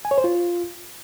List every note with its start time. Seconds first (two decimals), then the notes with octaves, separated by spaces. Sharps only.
0.05 G#5
0.11 C#5
0.18 C5
0.24 F4